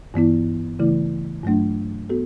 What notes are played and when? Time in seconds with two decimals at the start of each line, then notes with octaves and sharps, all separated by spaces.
0.14 G2 E3 B3 E4
0.79 C#3 E3 A3 E4
1.44 G2 F#3 A3 D4
2.10 B3 F#4 A4